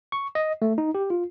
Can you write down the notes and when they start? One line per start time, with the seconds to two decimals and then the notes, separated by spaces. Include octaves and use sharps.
0.12 C#6
0.35 D#5
0.62 A3
0.78 D#4
0.95 G4
1.10 F4